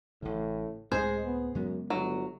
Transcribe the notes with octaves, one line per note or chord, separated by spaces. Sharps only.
A1 A2 C#3
C#2 A2 G#3 C4 G#4 C5
B3
F#2 C#3 G#3 B3
G1 F#3